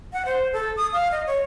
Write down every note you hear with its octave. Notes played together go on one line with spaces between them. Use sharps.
F#5
C5
A4
D#6
F5
D#5
C#5